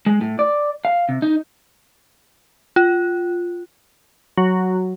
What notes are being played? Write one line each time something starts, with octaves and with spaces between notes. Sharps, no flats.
G#3
A2
D5
F5
C3
D#4
F4
F#3